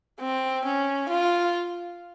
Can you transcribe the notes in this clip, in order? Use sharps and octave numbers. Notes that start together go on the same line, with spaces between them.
C4
C#4
F4